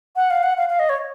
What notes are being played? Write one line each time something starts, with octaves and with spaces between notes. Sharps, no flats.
F#5
F5
F#5
F5
F5
D#5
C#5